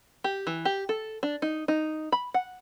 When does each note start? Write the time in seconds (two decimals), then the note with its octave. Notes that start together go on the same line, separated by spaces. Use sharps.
0.24 G4
0.47 E3
0.65 G4
0.89 A4
1.23 D4
1.42 D#4
1.68 D#4
2.12 B5
2.34 F#5